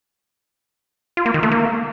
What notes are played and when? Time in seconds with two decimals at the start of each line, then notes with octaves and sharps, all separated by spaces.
1.17 F4
1.26 A#3
1.34 D#3
1.43 A3
1.52 A#3